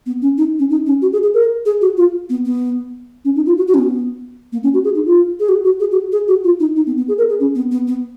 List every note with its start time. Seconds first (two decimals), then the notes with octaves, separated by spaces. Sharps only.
0.06 B3
0.22 C#4
0.38 D#4
0.59 C#4
0.70 D#4
0.86 C#4
1.02 F#4
1.13 G#4
1.23 G#4
1.34 A#4
1.66 G#4
1.81 F#4
1.97 F4
2.30 B3
2.45 B3
3.25 C#4
3.36 D#4
3.46 F4
3.57 F#4
3.68 F#4
3.74 C#4
3.79 B3
4.53 A#3
4.63 C#4
4.74 F#4
4.84 G#4
4.95 D#4
5.06 F4
5.40 G#4
5.49 F#4
5.65 F#4
5.80 G#4
5.91 F#4
6.12 G#4
6.28 F#4
6.44 F4
6.60 D#4
6.76 D#4
6.87 B3
6.97 B3
7.08 G#4
7.18 A#4
7.29 G#4
7.40 C#4
7.55 B3
7.71 B3
7.88 B3